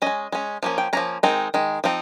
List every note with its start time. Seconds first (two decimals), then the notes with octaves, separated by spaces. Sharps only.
0.02 G#3 C#4 D#5
0.32 G#3 C#4
0.63 F3 A#3 C#4
0.78 G5
0.93 F3 A#3 C#4 A#5
1.23 D#3 G#3 C4 D#4
1.54 D#3 G#3
1.84 F3 C4 D#4